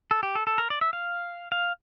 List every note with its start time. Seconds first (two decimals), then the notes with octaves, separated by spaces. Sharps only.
0.11 A4
0.23 G4
0.35 A4
0.47 A4
0.58 A#4
0.70 D5
0.81 E5
0.93 F5
1.52 F5